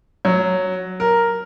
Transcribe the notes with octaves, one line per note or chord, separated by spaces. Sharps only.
F#3
A#4